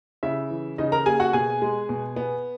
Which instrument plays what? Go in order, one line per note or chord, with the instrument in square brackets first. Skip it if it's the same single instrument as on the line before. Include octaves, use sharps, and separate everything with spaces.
[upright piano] C#3 E4 E5
E3
C#3 D#4 D#5
A#4 A#5
A#3 G#4 G#5
F#4 F#5
B2 G#4 G#5
G#3
B2
B3